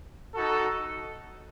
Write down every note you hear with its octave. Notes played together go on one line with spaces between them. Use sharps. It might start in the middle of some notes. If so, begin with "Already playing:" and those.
D#4 F#4 A4